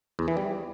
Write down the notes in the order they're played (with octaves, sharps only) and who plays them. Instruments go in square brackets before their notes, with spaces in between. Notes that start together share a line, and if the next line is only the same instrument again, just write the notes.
[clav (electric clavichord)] E2
E3
G3